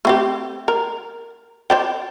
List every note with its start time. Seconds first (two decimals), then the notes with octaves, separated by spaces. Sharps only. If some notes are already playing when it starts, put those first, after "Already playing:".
0.05 A3 C4 G4
0.68 A#4
1.70 C5 D5 G5